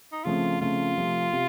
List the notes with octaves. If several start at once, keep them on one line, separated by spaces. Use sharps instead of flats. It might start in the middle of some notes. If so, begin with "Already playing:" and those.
D#4
C#3 F3 A3 C4 F4
C#3 F3 A3 C4 F4
C3 F3 A3
C3